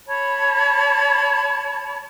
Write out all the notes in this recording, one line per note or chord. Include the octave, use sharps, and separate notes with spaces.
C#5 A5 B5